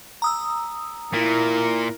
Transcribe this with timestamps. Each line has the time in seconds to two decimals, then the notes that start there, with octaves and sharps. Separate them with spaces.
0.22 A#5 D#6 E6
1.14 A#2 E4 A#4